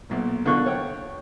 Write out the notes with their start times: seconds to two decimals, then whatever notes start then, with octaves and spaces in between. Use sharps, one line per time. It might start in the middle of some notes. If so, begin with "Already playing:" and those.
0.10 B1 A#2
0.45 B2 D3 A#3 F4 C#6 F#6
0.66 C#5 F#5 G5